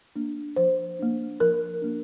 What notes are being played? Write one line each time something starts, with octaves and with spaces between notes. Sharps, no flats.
A#3 D4
F3 C5
A#3 D4
F3 A#4
A#3 D4